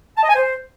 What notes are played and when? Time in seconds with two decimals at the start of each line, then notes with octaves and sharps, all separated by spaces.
0.17 A5
0.23 D#5
0.29 G#5
0.35 C5